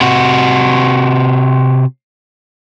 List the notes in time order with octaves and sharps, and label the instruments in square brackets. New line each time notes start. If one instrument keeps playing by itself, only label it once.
[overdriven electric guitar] C3 F#4